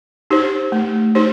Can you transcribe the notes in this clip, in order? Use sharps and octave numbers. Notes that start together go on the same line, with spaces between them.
D#4 G4 C5
A3
D#4 G4 C5